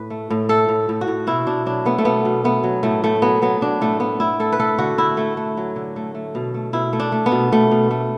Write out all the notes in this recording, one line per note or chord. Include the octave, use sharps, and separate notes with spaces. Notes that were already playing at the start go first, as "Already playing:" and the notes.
Already playing: A2 B4
A3
A2
A3 A4
A2
A2
F#4
A2
B2 E4
B2 D4
F#3 D4
A3 B3
A3
B2 B3
B2
A3 B3
F#3
A2 A3
A2 A3
F#3 B3
F#3 B3
F#3 D4
A2 A3
A3 B3
A2 E4
A3 A4
B4
A3 A4
D3 F#4
D3 E4
A3
A3
F#3
D3
A3
A3
B2
A3
B2 E4
A3
D4
A3
B3
B2
B2 A3
B2
A3